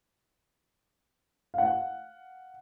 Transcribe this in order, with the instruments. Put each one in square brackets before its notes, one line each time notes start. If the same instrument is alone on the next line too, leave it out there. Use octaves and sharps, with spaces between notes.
[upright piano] F5 F#5